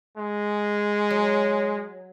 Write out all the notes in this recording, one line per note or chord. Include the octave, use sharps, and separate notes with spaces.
G#3
F#3